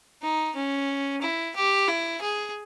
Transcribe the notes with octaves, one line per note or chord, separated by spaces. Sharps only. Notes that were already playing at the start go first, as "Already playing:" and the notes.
D#4
C#4
E4
G4
E4
G#4